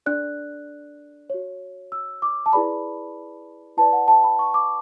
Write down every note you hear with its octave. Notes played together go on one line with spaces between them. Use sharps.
D4 A4 D5 F#6
F#4 C#5
E6
D6
A5
E4 G#4 B4 D5 B5
E4 B4 D5 A5
F#5
A5
B5
C#6
D6